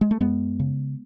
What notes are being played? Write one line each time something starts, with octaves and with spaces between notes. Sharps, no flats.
G#3
A3
F#2 G#3 B3
C#3